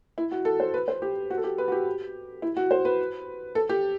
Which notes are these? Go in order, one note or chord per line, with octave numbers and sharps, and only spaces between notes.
E4
F#4
A4
C5
B4
C5
G4
F#4
A4
G4
B4
F#4
G4
E4
F#4
C5
B4
A4
G4